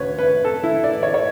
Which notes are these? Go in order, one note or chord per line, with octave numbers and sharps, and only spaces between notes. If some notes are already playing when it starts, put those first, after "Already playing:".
Already playing: D2 C#3 B4 C#5
B4
A4
E4
D5
C#5
C#5